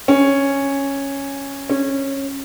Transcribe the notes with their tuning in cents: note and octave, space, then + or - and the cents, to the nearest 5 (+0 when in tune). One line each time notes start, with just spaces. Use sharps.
C#4 -5
C#4 -20